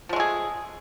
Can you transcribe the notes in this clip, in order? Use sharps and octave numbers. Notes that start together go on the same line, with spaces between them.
F3 G#3 A3 G#4